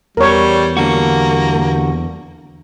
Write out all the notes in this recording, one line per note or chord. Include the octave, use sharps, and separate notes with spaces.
E2 G3 A#4 C#5
D3 G3 A#3 F#4